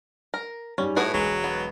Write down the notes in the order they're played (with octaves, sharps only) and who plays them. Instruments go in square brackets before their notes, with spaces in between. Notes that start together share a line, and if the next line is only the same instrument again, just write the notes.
[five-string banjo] A#4
[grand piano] G#2 G3 [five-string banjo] C#4
[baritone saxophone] A2 [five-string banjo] F#4 G#4 B4
[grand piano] E1 G#3 G7 [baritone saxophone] F#3
[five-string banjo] B3